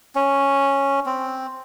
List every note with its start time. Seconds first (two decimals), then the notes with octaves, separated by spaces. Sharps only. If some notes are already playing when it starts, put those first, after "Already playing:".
0.15 C#4
1.06 C4